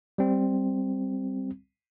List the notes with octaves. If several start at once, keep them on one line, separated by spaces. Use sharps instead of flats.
G3 C4